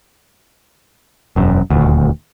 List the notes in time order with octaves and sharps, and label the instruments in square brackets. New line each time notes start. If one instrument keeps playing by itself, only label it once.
[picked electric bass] E1 F#2
D#1 G#1 D2